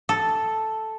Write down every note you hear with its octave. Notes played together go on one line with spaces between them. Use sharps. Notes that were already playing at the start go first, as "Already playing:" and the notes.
A4